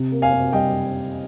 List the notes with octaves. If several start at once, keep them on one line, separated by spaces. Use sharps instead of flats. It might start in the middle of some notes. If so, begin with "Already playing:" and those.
Already playing: C3
A#3
F5 G#5
C3
G3 D#5 G5